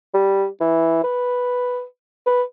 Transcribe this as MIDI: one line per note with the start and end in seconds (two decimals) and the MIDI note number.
0.14 0.45 55
0.60 1.04 52
1.04 1.83 71
2.26 2.42 71